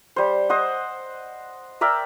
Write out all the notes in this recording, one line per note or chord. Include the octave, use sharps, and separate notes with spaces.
G3 C5
C5 D#5 F#5
A#4 D5 E5 G5